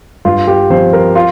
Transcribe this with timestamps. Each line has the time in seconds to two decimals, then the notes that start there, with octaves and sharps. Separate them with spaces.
0.25 G2 F4
0.48 G4
0.70 F3 C4 C5
0.93 A#4
1.15 F4